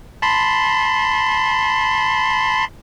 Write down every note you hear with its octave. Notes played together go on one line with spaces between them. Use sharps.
A5 B5 C6